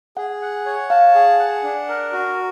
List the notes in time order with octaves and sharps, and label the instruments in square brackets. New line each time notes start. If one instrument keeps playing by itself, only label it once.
[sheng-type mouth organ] G#4 [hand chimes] F#5
[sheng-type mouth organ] F#5
C#5
[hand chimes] F5 [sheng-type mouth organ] A5
[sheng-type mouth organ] G#4
F#5
D4
A#4
F#4